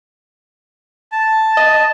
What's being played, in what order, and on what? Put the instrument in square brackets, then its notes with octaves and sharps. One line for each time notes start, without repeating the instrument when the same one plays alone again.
[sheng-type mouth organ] A5
[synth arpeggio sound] D#5